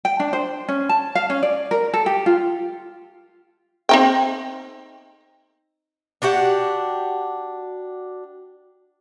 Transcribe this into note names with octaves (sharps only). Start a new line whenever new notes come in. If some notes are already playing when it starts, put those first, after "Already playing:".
G5
D4
C5
C#4
A5
F5
C#4
D5
A#4
A4
G4
F4
C4 D#4 G5
D4 F#4 G4 F#5